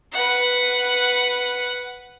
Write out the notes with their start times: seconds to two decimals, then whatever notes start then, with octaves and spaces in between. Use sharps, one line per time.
0.13 B4 F#5